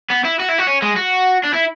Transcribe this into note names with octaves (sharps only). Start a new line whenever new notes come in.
B3
E4
F#4
E4
F#4
C#4
G#3
F#4
D4
E4